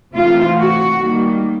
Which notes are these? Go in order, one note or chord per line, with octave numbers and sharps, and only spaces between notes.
C3 E3 A3 C4 F4
F#4
D#3 G3 A#3